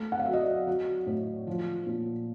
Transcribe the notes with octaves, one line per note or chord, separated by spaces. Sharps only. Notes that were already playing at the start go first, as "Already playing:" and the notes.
Already playing: A3
F#5
F5
F#3 E5
D#5
D5
F#3
A2
F3
A#2